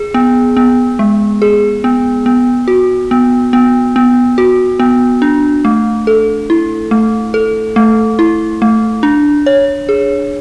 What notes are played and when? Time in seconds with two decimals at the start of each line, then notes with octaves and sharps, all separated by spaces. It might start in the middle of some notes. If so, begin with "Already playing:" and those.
Already playing: G#4
0.14 B3
0.57 B3
0.99 G#3
1.42 G#4
1.84 B3
2.26 B3
2.68 F#4
3.11 B3
3.53 B3
3.96 B3
4.38 F#4
4.79 B3
5.22 D4
5.65 A3
6.07 A4
6.50 E4
6.91 A3
7.34 A4
7.76 A3
8.19 E4
8.62 A3
9.03 D4
9.46 C#5
9.89 G#4